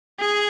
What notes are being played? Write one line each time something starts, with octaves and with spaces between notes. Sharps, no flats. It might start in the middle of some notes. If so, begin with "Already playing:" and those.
G#4